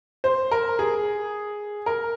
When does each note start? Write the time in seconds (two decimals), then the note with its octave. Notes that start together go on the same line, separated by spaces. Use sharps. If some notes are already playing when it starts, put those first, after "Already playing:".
0.24 C5
0.51 A#4
0.79 G#4
1.86 A#4